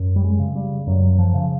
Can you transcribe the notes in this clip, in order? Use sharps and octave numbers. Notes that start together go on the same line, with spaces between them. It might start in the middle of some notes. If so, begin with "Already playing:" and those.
Already playing: F#2
G3
G#3
C#3
G3
F#2 F#3
F3
C#3